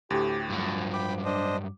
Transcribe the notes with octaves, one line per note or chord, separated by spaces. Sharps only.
D2 A2 G4
G2 F3 F#3
G5 B5 D6
D4 C5 D#5